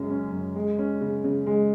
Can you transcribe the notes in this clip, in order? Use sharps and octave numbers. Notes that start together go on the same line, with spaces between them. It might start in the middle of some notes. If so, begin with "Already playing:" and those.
Already playing: F#2 C#3 G#3 C#4
C#4
F#2
G#3
C#4
C#3
C#3
G#3